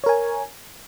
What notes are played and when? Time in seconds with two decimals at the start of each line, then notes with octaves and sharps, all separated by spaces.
0.04 C#5
0.06 A#4
0.09 G#5